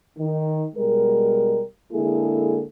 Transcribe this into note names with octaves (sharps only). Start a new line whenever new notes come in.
D#3
B2 G3 G#3 A#4
D3 G#3 A#3 E4 G#4 A4